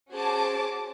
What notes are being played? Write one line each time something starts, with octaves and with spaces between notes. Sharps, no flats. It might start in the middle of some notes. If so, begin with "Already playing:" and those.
C#4 F#4 G#4 C5 A5 D6